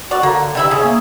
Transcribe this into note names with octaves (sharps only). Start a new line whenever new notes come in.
F#4 D5
D3 A#3
C3 G3 E4 E5
C#4 G#4
A#3